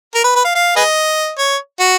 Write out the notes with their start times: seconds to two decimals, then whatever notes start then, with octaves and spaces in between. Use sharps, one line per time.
0.15 A#4
0.24 B4
0.35 B4
0.45 F5
0.55 F5
0.76 G#4 B4 D#5
1.38 C#5
1.80 F#4